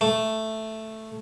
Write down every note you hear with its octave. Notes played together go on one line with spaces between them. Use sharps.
A3